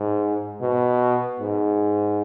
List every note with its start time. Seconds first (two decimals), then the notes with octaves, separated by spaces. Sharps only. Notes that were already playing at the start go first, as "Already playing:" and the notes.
Already playing: G#2
0.61 B2
1.40 G#2